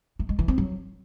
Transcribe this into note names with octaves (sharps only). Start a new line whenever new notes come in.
A3
G#3
E3
C4
F#3